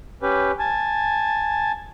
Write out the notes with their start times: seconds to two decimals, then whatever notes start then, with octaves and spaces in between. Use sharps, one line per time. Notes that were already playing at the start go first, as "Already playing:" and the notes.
0.22 C#4 G4 B4
0.59 G#5 A5